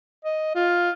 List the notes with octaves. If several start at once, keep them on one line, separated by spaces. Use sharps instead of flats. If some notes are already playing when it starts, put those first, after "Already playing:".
D#5
F4